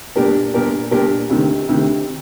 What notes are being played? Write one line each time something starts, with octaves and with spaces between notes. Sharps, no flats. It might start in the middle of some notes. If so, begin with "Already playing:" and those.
A#2 G3 D4 G4 A#4
A#2 G3 D4 G4 A#4
A#2 G3 D4 G4 A#4
D2 C3 D#3
D2 C3 D#3